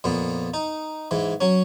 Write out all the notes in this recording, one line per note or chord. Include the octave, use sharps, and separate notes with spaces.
F2 A#2 B3
D#4
G#2 E3
F#3 C#4